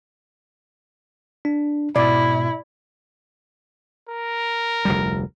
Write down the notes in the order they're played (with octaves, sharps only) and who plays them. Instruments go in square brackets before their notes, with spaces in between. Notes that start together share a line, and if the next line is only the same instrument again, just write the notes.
[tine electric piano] D4
[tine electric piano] G#2 B2 [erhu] E4 [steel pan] D5
[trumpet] A#4
[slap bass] F1 D2 G3